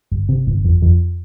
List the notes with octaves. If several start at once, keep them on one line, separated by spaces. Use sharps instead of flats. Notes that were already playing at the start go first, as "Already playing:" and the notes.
G1
C3
G1
F2
F2